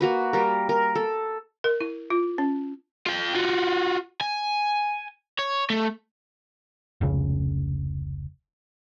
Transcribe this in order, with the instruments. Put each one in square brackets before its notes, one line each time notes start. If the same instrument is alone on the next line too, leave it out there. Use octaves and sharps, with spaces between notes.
[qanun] A#3 F#4 B4
G3 A#4
A#4
A4
[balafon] A#4
E4
F4
C#4
[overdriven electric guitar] F4 G5
F4 F#4
G#5
C#5
A3
[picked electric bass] F1 C#2 C#3